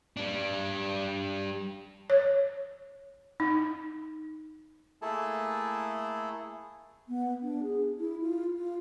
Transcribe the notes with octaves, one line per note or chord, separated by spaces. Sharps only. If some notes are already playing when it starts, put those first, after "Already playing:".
G3 D4
C#5
D#4
A3 A#3 E4 G#4 A4 A5
B3
D4
G#4
E4
F4
F4